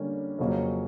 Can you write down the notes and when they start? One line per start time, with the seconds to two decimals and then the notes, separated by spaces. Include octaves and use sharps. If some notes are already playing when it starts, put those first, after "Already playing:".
Already playing: D3 G3 A#3 C#4
0.39 F2 C#3 F#3 A#3 C#4